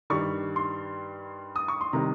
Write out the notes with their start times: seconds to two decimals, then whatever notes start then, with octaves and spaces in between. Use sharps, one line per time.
0.10 G2 D#3 G3 C#6
0.56 C6
1.56 D#6
1.68 C#6
1.81 C6
1.93 C3 D#3 G3 A#5